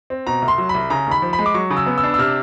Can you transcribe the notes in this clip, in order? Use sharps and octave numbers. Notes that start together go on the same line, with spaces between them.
C4
B2 A#5
C2
C6
F#3
C2 B5
C#3 A#5
D#2
B5
F3
B5
G#3
D6
F#3 C#6
C#3
E6
B3
E6
D4
E6
C3 F6